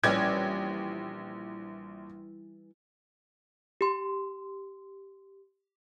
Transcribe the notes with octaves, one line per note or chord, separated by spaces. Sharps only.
A#1 E3 G3 C#4 D6 G#6
G4 C6